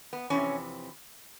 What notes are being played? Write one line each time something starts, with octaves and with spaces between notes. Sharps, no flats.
B3
F2 C3 E3 C#4